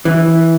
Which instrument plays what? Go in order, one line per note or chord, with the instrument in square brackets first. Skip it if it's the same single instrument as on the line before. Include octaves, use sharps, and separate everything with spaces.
[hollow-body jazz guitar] E3